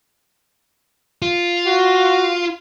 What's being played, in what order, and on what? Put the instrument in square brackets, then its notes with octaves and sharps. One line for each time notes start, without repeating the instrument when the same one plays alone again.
[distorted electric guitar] F4
[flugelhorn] F#4